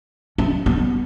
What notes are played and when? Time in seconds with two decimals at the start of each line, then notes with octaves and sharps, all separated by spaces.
0.38 C#4
0.66 B3